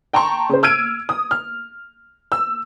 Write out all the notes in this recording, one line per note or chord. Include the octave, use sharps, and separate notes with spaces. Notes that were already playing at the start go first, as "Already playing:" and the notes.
G5 A5 A#5 C6 C#6
C#3 C5
E6 F6 G#6 D7 D#7
D#6
F6
E6